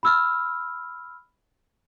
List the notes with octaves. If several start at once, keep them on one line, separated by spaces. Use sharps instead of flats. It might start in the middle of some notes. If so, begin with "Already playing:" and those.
B5 E6 F6